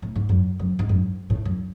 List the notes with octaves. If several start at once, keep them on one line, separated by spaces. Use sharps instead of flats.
A2
G#2
F#2
F#2
G#2
F#2
A2
F#2